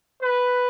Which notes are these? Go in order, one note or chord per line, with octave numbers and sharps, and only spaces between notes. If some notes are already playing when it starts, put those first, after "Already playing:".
B4